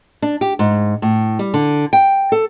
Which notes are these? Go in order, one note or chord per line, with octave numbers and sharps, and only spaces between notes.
D4
G4
G#2
A2
G3
D3
G5
A4